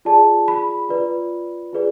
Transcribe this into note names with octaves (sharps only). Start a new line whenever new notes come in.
F4 G#4 D5 A5
B5
F4 B4 D5
F4 G#4 B4 D5